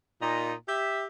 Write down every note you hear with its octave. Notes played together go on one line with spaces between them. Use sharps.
A#2 D#4
G4 E5